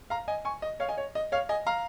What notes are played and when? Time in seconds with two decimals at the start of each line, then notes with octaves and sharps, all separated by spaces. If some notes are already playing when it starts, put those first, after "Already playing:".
0.10 F5 A#5
0.28 D#5 G#5
0.45 G#5 C#6
0.62 D#5
0.80 C#5 F5
0.89 D#5 G#5
0.97 C#5
1.15 D#5
1.32 C#5 F5
1.49 D#5 G#5
1.67 F5 A#5